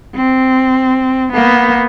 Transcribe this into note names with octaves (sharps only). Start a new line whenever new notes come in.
C4
A#3 B3